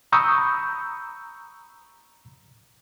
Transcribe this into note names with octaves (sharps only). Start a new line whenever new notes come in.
A#5 B5 C#6 D#6 E6 G6